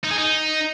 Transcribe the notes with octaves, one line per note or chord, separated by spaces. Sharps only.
D#4
G#4
D#4